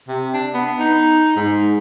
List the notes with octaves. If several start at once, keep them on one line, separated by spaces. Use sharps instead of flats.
C3
D4
B3
D#4
G#2